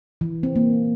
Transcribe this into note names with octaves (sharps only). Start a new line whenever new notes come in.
E3
C4
A#3